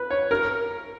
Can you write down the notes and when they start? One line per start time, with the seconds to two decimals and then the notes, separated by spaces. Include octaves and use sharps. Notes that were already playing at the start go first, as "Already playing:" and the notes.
Already playing: B4
0.10 C#5
0.31 A#4